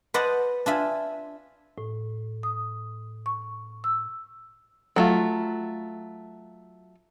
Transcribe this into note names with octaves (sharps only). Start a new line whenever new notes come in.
B4 C5 D5 D#5 F#5 A5
D4 F4 E5 G#5
A2
D#6
C#6
E6
F#3 A3 F4